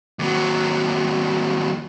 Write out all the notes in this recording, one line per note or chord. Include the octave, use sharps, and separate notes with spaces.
D#2 F#3